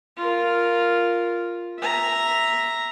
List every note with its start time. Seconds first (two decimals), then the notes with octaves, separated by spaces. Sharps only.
0.17 F4 A#4
1.79 E5 A#5